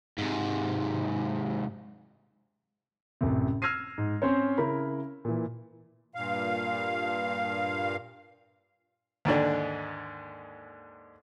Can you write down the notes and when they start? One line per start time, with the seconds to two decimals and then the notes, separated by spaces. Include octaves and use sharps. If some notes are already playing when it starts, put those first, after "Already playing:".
0.18 G#2 C3
3.21 A1 F#2 C3
3.62 E6 F6 G#6 A#6 C7 D#7
3.98 G#2
4.22 C4 C#4 C5 C#5
4.58 C#3 E4 A#4 B5
5.25 A#2 E3
6.15 G2 A#2 F5
9.25 D#2 G#2 D3 D4